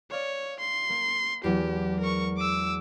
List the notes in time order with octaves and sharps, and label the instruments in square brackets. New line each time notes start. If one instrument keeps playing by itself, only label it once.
[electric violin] C#5 [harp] D5 F5 C#6
[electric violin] C6
[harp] A#3
[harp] E2 F#3 G#3 [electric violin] G4
[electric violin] A#4 C#6
D6 E6